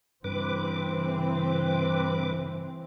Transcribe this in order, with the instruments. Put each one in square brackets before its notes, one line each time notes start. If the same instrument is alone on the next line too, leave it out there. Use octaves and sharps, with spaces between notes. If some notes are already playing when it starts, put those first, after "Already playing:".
[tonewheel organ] G2 B4 D6 [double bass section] C#3 E3 C4